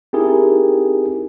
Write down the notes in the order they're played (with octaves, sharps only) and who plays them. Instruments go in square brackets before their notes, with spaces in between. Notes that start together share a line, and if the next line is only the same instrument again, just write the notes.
[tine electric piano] C4 D#4 E4 G4 G#4 A#4